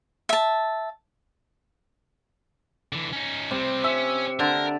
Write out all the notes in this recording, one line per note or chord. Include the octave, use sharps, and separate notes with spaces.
E5 A5
D3 E3
C#4 D#4
C3 G3 C4
C#4 E5
D3 A#4